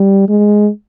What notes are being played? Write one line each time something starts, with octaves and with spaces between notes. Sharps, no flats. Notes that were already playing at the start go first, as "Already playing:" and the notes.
Already playing: G3
G#3